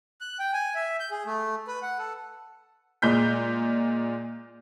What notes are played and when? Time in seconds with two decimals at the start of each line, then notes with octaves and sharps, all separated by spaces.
0.21 F#6
0.39 G5
0.53 G#5
0.75 E5
1.00 G6
1.11 G#4
1.26 A3
1.67 B4
1.83 F#5
1.98 A4
3.02 A#2 G#3 G6 B6